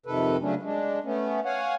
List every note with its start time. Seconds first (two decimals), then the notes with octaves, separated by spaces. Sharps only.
0.06 F2 C3 D#3 A4 B4
0.40 C#3 F#3 A3 C#4 D4
0.63 G#3 D4
1.04 A3 B3 C#4
1.45 C#5 F5 F#5 G#5